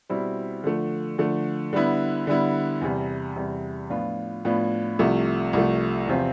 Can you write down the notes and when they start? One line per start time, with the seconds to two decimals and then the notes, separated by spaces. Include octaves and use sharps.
0.09 B2 G3 C4 E4
0.64 D3 F3 A3
1.18 D3 F3 A3
1.73 D3 G3 B3 E4
2.27 D3 G3 B3 E4
2.81 E2 C3 G3
3.36 E2 C3 G3
3.90 A2 F3 B3 D4 F4
4.45 A2 F3 B3 D4 F4
4.99 C2 C3 F3 A3
5.53 C2 C3 F3 A3
6.07 E2 C3 F3 C4 F4